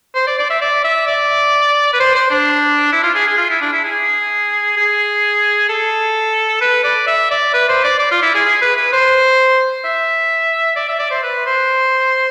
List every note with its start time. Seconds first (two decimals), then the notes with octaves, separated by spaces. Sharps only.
0.15 C5
0.27 D5
0.39 D5
0.50 E5
0.61 D5
0.84 E5
1.07 D5
1.93 B4
2.00 C5
2.15 C5
2.31 D4
2.92 E4
3.04 F4
3.15 G#4
3.27 G#4
3.38 F4
3.50 E4
3.61 D4
3.73 E4
3.85 G#4
4.77 G#4
5.69 A4
6.61 B4
6.84 D5
7.07 E5
7.31 D5
7.54 B4
7.69 C5
7.84 D5
7.99 D5
8.11 F4
8.23 E4
8.35 G#4
8.46 G#4
8.61 B4
8.77 B4
8.93 C5
9.84 E5
10.76 D5
10.89 E5
10.99 D5
11.11 C5
11.23 B4
11.46 C5